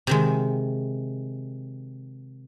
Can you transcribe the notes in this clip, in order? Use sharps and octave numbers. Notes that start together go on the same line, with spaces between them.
C3 D#3 G#3